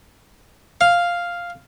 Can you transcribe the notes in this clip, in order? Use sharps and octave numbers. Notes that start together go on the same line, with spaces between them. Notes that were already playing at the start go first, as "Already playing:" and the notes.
F5